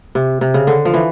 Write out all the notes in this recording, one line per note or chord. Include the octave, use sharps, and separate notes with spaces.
C3
C3
C#3
D3
F3
E3